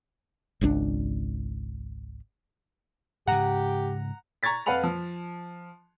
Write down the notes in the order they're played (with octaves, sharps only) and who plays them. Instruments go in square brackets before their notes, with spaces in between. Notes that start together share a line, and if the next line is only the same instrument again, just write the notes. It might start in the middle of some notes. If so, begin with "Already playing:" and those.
[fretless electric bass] G#1 C#2 C#4 D4
[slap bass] G#2 C#3 [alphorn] G4 [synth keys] F#5 A#5
[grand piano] A#5 C#6 G#6 A6 B6
F2 B4 F5 F#5 B5 F7
F3